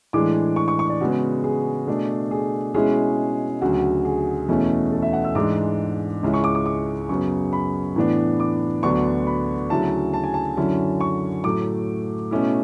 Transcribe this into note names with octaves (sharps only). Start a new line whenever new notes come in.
A2 E3 G#3 D4 D6
C#6
C#6
C#6
D5
C#3 G#3 B3 F#4
G#4
B2 A3 D4
G#4
B2 G#3 C#4 E4 G#4
D2 C#3 F#3 F#4
G#4
E2 B2 A3 C#4 E4
A4
E5
F#5
E6
G#2 E3 G#3 D4 D6
C#2 C#3 G#3 C#4 E4
C#6
D6
D6
D6
F#2 C#3 F#3 B3 C#6
B5
A2 E3 B3 D4
D6
D2 D3 F#3 B3 D4 C#6
B5
D2 C#3 F#3 C#4 E4 A5
A5
G#5
A5
F#2 D3 F#3 C#4 E4
C#6
A2 F#3 A3 D6
B2 A3 C#4 E4